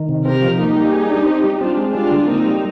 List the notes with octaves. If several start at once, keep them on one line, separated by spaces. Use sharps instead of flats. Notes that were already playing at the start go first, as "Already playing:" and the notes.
Already playing: D#3
C3
C4 G4 A#4
F3
A#3 D#4 G4
G3
G#4
D4
C4
G3
C4 D4 F4
G#3
G3 D4 F4
D3
A#3 C4 D#4
G3